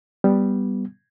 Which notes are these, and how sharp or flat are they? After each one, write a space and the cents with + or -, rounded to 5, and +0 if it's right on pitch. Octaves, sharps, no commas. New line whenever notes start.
G3 +0 B3 +0